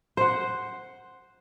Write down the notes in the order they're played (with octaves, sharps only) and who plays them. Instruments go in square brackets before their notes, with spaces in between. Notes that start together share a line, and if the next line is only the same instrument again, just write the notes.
[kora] C5 F#5